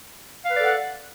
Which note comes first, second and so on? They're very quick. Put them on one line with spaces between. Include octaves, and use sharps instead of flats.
F5 B4 D5 A4 F#5